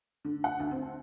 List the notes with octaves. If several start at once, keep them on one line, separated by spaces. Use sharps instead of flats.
D3
F#5
D2
C4